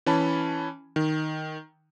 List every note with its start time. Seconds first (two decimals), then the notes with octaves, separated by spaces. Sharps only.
0.06 E3 C#4 A5 B5
0.96 D#3